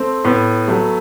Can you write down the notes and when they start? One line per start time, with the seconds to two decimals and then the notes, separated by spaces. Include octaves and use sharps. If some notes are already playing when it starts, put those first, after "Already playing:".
Already playing: A3 C4
0.24 A2 B3
0.68 F#3 A3